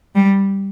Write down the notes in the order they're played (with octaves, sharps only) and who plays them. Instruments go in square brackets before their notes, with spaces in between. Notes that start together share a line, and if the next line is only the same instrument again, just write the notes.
[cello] G3